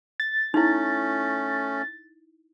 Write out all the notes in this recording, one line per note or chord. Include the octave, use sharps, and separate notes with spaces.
A6
A3 C#4 D#4 E4